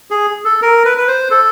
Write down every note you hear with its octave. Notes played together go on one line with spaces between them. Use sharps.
G#4
A4
A#4
B4
B4
C5
A4